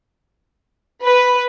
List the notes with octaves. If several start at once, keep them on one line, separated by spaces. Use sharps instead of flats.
B4